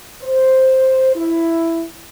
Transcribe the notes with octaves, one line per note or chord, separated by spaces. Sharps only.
C5
E4